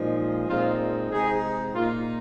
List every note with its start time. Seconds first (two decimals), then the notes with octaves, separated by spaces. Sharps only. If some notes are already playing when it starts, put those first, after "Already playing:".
Already playing: A#2 F3 G#3 D#4
0.48 A#2 G#3 C4 D#4 F4
1.11 C3 G#3 C4 D#4 G#4
1.74 A#2 A#3 D#4 F4